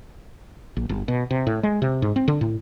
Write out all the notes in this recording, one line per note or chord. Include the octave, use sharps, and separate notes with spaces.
A#1
G1
B2
C3
A2
G#3
C3
G#2
C4
D3
A2